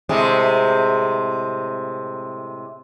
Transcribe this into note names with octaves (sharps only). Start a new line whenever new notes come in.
A2 C3 G#3